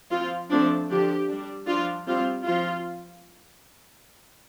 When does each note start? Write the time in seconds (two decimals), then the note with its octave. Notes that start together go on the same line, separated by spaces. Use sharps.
0.12 F3 C4 F4
0.50 F3 A3 C4 D4
0.90 D3 F3 D4 G4
1.29 G3 D4
1.68 F3 D4 F4
2.07 G3 C4 F4
2.46 F3 C4 F4